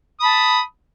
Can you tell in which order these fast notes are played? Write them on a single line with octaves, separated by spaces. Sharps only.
D#6 B5 A5